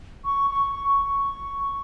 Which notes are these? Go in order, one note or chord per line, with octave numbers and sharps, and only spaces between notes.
C#6
C#6
C#6